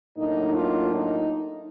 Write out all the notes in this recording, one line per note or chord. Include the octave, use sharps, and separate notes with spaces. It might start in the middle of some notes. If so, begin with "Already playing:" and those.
A2 F#3 A#3 D4 D#4
D#4 F4
D#4